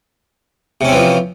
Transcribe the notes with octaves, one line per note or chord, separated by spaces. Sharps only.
C3 E3 F3 C4 C#4